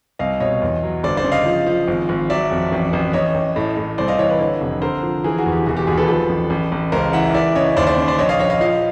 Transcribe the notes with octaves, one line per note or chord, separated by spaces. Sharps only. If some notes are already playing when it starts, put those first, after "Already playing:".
C2 D#5 F5
B2 C#5 D#5
E2
F#3
G1 C5 D5
C5 D5
C#3
D#5 F5
F3
F3
G#1
G#1
F#3 D5 E5
F2
A1
A1
A1 C#5 D#5
A1
A2
A2
C2 C5 D5
D#5 F5
E3 C#5 D#5
B4 C#5
D3
F1
D3 A#4 C5
F3
E3 G#4 A#4
F#4 G#4
E2
G4
E1 F#4
G4
D#2 F#4 G#4
A4 B4
F3 A4 B4
A1
A1
A1
C#2 A#4 C5
E3 E5 F#5
E3 D5 E5
C#3 C#5 D#5
D#2 C5 D5
C5 D5
C#3
C5 D5
A#1 C#5 D#5
D#5 F5
A#1 C#5 D#5
D#5 F5
F3 D#5 F5